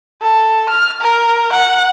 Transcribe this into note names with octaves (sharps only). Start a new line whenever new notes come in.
A4
F6
A#4
F#5